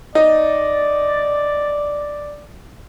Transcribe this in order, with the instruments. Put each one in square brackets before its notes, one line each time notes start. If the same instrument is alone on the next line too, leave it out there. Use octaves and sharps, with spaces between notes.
[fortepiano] D#4 [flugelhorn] D5